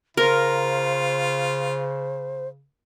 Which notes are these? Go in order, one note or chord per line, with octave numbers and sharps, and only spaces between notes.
C#3 F4 A#4 C5